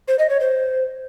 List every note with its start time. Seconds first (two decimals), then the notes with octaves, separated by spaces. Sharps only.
0.08 C5
0.19 D#5
0.30 C#5
0.40 C5